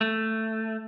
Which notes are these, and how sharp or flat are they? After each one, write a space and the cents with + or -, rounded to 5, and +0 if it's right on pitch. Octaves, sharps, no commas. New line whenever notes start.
A3 +10